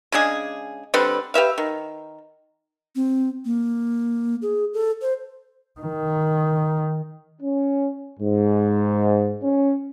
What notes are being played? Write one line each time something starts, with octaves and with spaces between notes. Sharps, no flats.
C#3 G#3 D4 G#4
D3 G3 C4 B4
G4 B4 E5 F5
D#3
C4
A#3
G#4
A4
C5
D#3
C#4
G#2
C#4